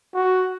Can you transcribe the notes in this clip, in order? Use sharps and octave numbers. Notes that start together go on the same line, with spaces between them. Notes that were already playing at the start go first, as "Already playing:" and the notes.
F#4